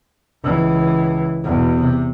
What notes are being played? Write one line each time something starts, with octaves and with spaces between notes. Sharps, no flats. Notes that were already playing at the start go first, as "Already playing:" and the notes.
C#2 E3
E2 B2
C3